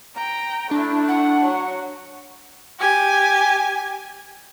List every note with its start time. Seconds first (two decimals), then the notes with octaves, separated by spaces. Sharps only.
0.16 G5 A#5
0.71 A3 D4 E4
1.08 F#5
1.41 F#3
2.79 G4 G#5